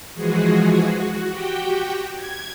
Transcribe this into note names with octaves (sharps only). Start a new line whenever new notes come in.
E3 F3 G#3 F#4 G#4
F#4
F#4 G4 G5
G#6